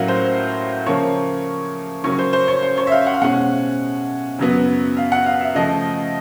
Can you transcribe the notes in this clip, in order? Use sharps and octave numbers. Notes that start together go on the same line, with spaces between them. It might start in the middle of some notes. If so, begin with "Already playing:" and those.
Already playing: A2 F#3 A#3 C#4 F5 F#5
C5
C#3 F3 A#3 C#5
C#3 F#3 A#3 C#4 C#5
C5
C5
C#5
C5
C#5
E5
F5
F#5
F5
B2 G#3 C#4 F#5
F#2 C#3 F#3 B3
F5
F#5
F5
E5
C#3 F3 A3 D#5